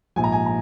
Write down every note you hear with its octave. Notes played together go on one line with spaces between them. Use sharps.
A#1 G#2 F3 G#5
A#5
G#5
A#5